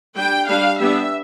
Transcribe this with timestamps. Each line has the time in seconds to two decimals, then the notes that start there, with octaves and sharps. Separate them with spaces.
0.16 G3 D4 G5
0.48 G3 D4 F5
0.79 G3 B3 D4 E5